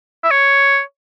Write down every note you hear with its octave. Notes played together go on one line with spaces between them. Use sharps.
E5
C#5